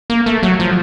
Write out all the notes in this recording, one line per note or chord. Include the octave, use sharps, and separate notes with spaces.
A#3
A3
F#3
F3